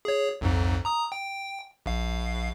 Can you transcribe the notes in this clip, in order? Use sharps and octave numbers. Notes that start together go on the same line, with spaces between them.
G#4 C#5
B1 F2 G#2
A#5 D#6
G5
A#1 F5